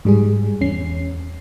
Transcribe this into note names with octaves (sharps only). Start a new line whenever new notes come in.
G#2 G3 G#4
E2 C#4 C7